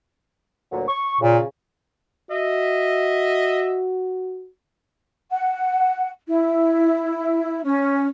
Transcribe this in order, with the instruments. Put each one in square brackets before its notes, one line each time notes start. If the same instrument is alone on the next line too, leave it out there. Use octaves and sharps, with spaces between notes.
[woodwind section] D2 A#2 F#3
C#6
[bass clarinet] A#2 [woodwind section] C#3
[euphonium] F#4 [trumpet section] D#5 E5
[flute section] F#5
E4
C#4